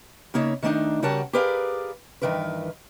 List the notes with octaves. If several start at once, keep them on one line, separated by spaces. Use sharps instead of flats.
C#3 A#3 D#4 C#5 E5
D#3 A3 A#3 D4 D#4
C#3 G3 F#4 A#4 F#5 A5
G4 G#4 A#4 B4 D5 F5
G2 D#3 E3 A#4 B4